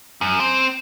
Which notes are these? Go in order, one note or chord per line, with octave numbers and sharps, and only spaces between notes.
F#2
C4